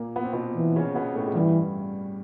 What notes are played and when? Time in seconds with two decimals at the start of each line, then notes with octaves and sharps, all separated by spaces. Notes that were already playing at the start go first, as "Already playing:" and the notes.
Already playing: A#2 A#3
0.16 B3
0.24 C4
0.33 B2 B3
0.56 E3
0.76 C#3 C#4
0.95 B2 B3
1.15 A2 A3
1.27 G#3
1.35 G2 E3 G3